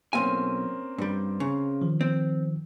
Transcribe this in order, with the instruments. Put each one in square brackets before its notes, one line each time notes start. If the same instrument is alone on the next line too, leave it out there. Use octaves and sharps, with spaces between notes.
[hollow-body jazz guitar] B1 F#2 G#5 [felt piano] A#3 C4 C#4
[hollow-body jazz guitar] G2 G3
C#3
[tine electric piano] D#3 F3
[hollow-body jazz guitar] C4